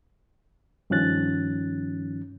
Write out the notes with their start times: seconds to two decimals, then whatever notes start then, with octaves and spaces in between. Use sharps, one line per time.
0.90 G2 D#3 F3 C#4 F#6 A6